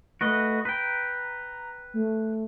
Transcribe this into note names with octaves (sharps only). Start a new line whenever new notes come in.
A3 F#4 B4 D#5
B4 G5 A#5
A3